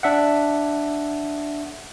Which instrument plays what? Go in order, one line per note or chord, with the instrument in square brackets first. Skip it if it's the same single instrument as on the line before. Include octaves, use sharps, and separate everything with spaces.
[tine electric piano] D4 E5 F#5